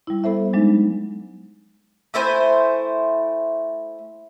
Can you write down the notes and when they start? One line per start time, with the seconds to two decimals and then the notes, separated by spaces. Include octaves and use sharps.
0.07 G3 E4
0.24 B3 A4 C5 E5
0.53 F#3 G#3 D4 D#4
2.14 A3 E4 C5 G#5